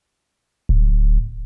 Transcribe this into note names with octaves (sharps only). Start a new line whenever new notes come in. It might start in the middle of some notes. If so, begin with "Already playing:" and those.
D1